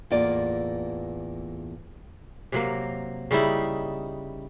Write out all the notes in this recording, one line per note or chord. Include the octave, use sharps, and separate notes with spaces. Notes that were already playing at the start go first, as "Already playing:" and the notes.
E2 A2 A#3 F4 D5
C3 F#3 A#3
C#3 G3 D#4 E4